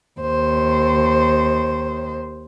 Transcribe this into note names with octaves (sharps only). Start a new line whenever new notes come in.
D#2 C5